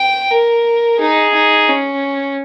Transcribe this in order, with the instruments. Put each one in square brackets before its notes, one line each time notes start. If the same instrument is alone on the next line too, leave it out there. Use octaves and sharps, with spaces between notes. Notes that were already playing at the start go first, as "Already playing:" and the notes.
Already playing: [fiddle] G5
A#4
[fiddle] D#4 [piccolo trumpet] G#4
[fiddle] D#4
C#4